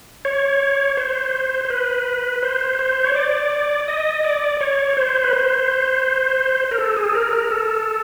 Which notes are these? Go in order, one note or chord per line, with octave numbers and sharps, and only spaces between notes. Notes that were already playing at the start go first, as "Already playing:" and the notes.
C#5
C5
C5
B4
C5
C5
C#5
D5
D#5
D5
C#5
C5
B4
C5
A#4
A4
G#4
A4
A#4
A#4
A4